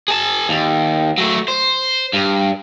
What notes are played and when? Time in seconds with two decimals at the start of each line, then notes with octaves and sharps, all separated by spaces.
0.08 G#4 A5
0.49 D#2
1.18 F#3 A3
1.48 C5
2.13 G2